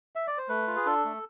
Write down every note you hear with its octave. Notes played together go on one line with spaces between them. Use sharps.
E5
D5
C5
A3 B4
F4
G#4
D4 A4
A3